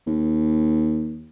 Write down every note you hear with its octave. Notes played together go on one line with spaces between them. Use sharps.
D#2